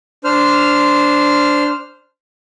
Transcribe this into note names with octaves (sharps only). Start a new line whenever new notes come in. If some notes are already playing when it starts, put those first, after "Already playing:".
D4 C5 F6